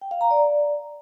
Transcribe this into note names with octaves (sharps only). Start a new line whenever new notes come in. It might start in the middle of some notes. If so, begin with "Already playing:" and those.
G5
F5
A#5
D5